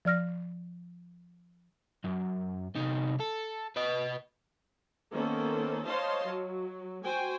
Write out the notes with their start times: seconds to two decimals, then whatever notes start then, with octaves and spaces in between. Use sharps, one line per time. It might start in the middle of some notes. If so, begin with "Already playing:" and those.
0.05 F3 D5 F6 A#6
2.04 F#2
2.75 C2 D#4
3.20 A4
3.76 B4 D#5
5.13 D#3 A#3 B3 C#4 A4 C5
5.86 C5 C#5 D#5 F5 A5 C6
6.25 F#3
7.04 F#4 C5 G5 G#5